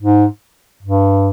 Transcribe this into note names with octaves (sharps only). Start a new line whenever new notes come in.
G#2
G2